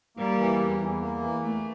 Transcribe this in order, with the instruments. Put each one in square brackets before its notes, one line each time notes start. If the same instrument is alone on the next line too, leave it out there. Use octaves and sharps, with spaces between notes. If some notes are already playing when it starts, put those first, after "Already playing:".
[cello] G3 [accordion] A#3
[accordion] E3
E2
E2
A#3
E3
[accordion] E2 [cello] A3